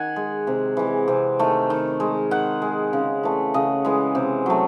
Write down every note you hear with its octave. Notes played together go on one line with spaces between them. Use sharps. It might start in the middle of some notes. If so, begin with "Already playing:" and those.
Already playing: D#3 F#5 G#5
G#3
C3
E3 G#3
C3
D#3 A3
D#3
G#3
D#3 F#5
G#3
C#3
E3 A3
C#3 D#5
E3 G#3
C3
F#3 A3